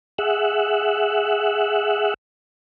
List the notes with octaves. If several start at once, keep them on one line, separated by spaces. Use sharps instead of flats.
G#4 E5 F#5